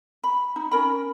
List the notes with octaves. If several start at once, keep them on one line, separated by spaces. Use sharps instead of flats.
B5
D#4
C#4 A#4 B5